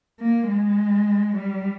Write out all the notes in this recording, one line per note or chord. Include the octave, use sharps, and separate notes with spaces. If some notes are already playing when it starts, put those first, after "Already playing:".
A#3
G#3
G3